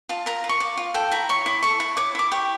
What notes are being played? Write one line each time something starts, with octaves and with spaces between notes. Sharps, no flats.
F4 A5
A#4 A#5
F4
C#6
D5
F4
A4 G5
E4 A#5
C#5 C#6
E4 D6
A4 C#6
E4
C#5 D6
E4 D6
G4 C#6